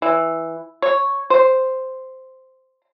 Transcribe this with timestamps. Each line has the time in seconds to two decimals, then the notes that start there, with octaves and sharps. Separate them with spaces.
0.02 E3
0.82 C#5
1.30 C5